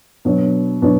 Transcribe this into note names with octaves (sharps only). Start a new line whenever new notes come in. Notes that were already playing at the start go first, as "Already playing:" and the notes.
B2 F#3 D4
B2 F#3 D4